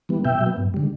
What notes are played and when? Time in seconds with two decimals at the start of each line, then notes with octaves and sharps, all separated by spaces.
0.09 E3 G3 B3
0.25 B2 E5 G5
0.41 F#3
0.46 B3
0.57 G2
0.74 D3 G3